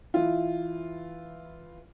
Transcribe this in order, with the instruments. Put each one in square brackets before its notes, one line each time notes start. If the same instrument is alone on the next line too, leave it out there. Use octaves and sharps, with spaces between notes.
[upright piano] E3 E4 F4